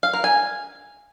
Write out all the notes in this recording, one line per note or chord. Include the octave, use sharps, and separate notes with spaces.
F5
A#4
G#5